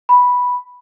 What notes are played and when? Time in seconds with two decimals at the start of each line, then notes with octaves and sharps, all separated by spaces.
0.09 B5